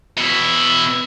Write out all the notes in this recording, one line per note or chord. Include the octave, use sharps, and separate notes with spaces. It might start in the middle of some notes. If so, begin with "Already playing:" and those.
B2 E4